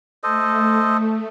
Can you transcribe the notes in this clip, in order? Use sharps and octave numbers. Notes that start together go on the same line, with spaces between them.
A3 A4 C5 D#5